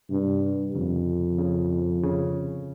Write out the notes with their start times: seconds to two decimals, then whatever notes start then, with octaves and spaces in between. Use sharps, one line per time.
0.10 G2 C3
0.75 F2 C#3
1.39 C#3
2.03 C#3